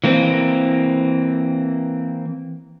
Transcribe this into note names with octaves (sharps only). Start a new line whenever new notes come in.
E3 A#3 C4